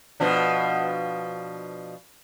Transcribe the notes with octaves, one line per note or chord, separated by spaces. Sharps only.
B2 F3 D4